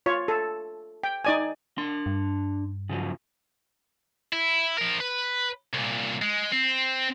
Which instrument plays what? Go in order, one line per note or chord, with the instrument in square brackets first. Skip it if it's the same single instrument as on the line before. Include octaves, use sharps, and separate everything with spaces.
[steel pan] F4 C#5
A4
G5
D#4 D5 G#5
[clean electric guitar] D4 C6
[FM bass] G2
[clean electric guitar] C#3 F3 F#3
[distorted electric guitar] E4
F3 A#4
B4
C2 A#2
G#3
C4